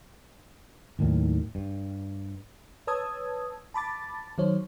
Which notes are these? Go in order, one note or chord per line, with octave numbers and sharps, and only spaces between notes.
D#2 A2 D#3 F#3
G2
B4 C#5 A5 D#6 E6 G#6
A5 B5 D6 A6
D#3 F#3 C5 C#5